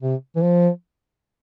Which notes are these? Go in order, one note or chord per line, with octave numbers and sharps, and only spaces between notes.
C3
E3
F3